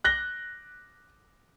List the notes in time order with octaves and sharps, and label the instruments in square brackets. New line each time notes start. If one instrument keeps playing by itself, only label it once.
[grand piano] F#6 A#6 G7